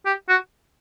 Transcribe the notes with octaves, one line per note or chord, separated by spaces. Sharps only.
G4
F#4